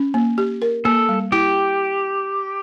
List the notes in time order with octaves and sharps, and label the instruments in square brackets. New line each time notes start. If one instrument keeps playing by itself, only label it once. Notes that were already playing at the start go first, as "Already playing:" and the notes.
Already playing: [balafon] C#4
A#3
G4
A#4
[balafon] A#3 [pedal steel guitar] A4
[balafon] G3
[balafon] E4 [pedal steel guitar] G4